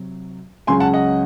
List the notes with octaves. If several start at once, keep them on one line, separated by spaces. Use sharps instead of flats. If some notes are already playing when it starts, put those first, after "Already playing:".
Already playing: C3 F#3
C#2 C#3 F#3 C#4 G#5 C6
F#5 A5
D#5 F#5